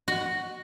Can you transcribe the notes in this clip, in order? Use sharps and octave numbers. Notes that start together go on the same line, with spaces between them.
F#4